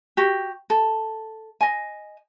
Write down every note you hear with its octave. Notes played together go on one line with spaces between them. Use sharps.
F#4 G4
A4
D#5 G#5